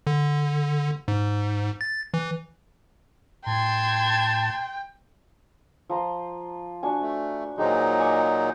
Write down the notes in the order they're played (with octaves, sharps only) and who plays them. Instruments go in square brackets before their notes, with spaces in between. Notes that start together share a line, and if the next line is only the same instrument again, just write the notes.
[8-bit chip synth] D3
G#2
A6
E3
[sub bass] A2 [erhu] G5 [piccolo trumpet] A5 [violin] C6 G#6
[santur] F3 A#5 C6
D4 F#4 G#5
[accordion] A3
[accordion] A#2 F#3 D#4 [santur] G#3 G4 C5
[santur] G#5 C#6 D6